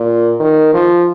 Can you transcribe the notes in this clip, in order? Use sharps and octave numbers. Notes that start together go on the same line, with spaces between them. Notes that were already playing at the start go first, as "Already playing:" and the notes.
Already playing: A#2
D#3
F3